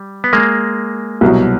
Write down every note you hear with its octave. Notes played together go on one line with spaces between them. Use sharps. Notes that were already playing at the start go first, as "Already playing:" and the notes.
Already playing: G3
B3
G#3 A#3
C2 B2 F#3